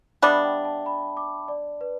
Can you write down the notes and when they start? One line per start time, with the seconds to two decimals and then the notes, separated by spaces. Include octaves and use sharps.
0.22 G3 B3 D4 E5
0.44 G5
0.65 A5
0.86 B5
1.17 D6
1.48 D5
1.81 B4